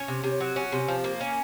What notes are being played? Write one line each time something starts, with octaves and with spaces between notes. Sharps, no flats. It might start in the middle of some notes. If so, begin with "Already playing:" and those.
Already playing: C#4 C#5
C3
C3
F#3
C#4
C3
F3
A#3
C#4